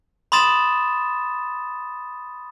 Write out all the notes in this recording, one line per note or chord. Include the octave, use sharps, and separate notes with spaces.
B5 C6 D#6 A6 E7